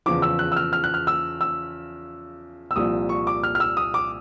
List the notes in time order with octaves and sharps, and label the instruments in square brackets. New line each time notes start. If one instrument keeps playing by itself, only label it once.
[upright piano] E2 C#3 F3 D6
E6
F#6
E6
F6
F6
F#6
F6
E6
E6
E6
C2 A#2 F3 D#6
C#6
D6
F6
F6
E6
D#6
D6